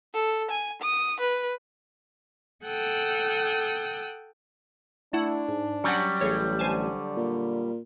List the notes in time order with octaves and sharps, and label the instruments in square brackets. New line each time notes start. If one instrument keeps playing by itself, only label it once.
[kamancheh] A4
G#5
D#6
B4
[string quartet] A4 F#5 G5 D#6 E6
[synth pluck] A3 E4 F#5 [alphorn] D4
[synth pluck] G#2
[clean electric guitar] F#3 G3 [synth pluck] C#4 F#5
[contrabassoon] A1 [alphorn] A2 [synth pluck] G#4 C#5
[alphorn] D3 [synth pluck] C5 G#5 A5
[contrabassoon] A#2